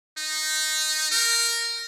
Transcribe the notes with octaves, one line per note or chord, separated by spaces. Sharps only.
D#4
A#4